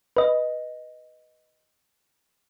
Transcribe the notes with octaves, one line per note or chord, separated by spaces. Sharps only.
B4 D#5